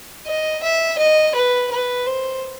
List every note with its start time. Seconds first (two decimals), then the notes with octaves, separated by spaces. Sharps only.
0.26 D#5
0.63 E5
0.98 D#5
1.35 B4
1.72 B4
2.07 C5